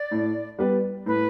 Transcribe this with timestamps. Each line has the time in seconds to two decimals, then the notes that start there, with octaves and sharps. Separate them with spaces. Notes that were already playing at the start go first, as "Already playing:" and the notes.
Already playing: D5
0.11 A2
0.59 G3 B3 G4 B4
1.06 A2 B4